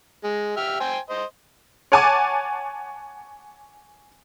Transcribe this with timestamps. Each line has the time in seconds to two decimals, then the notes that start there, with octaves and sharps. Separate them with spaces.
0.24 G#3
0.57 G4 E5 F6
0.80 C5 G5 G#5
1.10 C5 D#5
1.92 C#5 F#5 G#5 A5 D6